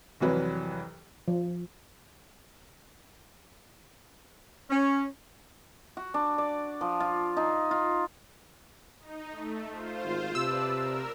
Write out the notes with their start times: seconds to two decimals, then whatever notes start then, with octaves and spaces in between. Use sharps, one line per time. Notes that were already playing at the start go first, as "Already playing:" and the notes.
0.20 C2 F2 E3 F#3 B4
1.28 F3
4.70 C#4
5.97 F#4
6.14 D4
6.38 D5
6.81 F3
7.00 F4
7.37 D#4
7.71 F4
9.00 D#4
9.30 A3
9.70 F4 C5
10.04 G#1
10.35 C3 B4 D5 A5 E6
10.68 A#4